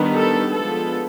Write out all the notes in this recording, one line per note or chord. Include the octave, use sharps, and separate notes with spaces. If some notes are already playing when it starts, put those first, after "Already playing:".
Already playing: D#3 G3 B3 D4
A4
F3 G#3 B3 D4 A4